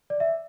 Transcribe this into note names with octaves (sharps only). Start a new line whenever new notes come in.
D5
E5